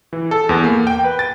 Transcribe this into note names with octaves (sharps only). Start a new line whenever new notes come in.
E3
A4
E2
A#3
G5
B4
A6